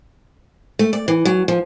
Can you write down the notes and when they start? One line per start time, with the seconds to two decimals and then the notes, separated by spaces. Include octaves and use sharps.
0.79 A3
0.93 D5
1.08 E3
1.25 F#3
1.48 F3